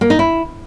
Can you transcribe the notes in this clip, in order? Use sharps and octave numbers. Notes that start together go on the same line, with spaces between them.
A#3
D#4
E4